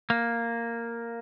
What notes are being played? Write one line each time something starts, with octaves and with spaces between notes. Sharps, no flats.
A#3